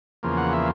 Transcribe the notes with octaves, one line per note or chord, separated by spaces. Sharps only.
E2 C#3 F3 A#3
F#5
E5